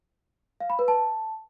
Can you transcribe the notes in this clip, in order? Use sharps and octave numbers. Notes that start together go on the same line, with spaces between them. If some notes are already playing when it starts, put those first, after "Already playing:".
F5
B5
B4
A5